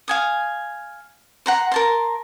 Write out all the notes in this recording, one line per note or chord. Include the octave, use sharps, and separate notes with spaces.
F5 G#5 D#6
F#5 A#5 C6
A#4 A5 C6